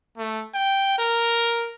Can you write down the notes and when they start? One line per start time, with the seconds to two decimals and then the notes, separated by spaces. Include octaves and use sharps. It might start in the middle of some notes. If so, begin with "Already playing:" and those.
0.18 A3
0.54 G5
0.99 A#4